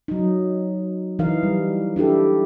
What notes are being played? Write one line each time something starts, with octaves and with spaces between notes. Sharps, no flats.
F#3 D#4
E3 D#4 A#4 F5
G3
D4 E4 G4 A4